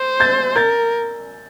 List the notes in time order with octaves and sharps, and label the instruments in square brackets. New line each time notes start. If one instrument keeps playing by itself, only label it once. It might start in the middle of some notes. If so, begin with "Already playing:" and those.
Already playing: [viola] C5
[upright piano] G6 A6
[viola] A#4 [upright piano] G6 A6